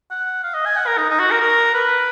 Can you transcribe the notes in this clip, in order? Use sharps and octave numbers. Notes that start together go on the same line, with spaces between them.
F#5
F5
D#5
G#5
F#5
A#4
D#4
D#4
F#4
A#4
A#4
B4